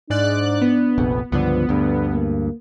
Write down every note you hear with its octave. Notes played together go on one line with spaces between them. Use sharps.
G#2 D4 D5 F#6
B3
F1 A#1 F2
C#2 G2 D3 F3 B3
D2 G2 D3
A#3